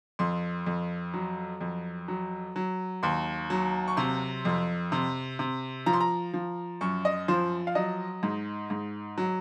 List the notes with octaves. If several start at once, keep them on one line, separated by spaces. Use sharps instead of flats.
F2 C6
F2
F#3
F2
F#3
F#3
D#2 C6
F#3
C#6
C3 C6
F2
C3
C3
F3 A#5
C6
A#5
F3
F#2 C#6
D#5
F3 C5
F5
F#3 D#5
G#2
G#2
F#3